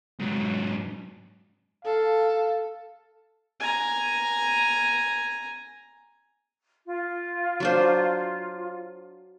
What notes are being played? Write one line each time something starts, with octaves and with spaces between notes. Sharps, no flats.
G#2 F#3
A4 F5
G#5 A#5
F4
F#3 D4 C5